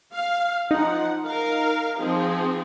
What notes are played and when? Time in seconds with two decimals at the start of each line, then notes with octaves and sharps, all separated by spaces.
0.13 F5
0.71 F3 D#4 F#5
1.26 A#4 F5
1.98 F3 C4 G#4